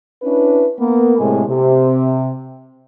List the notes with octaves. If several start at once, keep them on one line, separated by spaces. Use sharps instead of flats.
C#4 D4 E4 B4
A#3 B3
A2 C3 G#3 G#4
C3